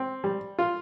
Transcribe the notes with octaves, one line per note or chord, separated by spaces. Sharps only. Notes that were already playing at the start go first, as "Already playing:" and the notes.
Already playing: C4
G3
F4